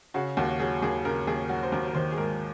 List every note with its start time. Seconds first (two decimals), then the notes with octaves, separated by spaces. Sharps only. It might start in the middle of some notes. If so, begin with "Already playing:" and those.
0.14 C#3 F#4
0.37 D#2 F#4
0.60 F#3 G#4
0.82 D#2 G#4
1.05 C#3 A#4
1.27 D#2 G#4
1.49 F#3 F#4
1.63 C5
1.72 D#2 A#4
1.88 A#4
1.95 D#3 C5
2.12 G#4
2.17 G#2 A#4